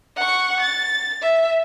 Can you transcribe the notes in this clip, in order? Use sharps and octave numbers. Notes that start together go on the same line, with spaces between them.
F#5 C#6
A6
E5